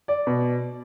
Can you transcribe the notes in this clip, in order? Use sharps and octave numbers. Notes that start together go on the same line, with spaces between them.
D5
B2